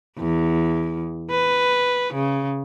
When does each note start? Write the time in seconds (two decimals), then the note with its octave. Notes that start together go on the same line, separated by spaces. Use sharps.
0.19 E2
1.31 B4
2.14 C#3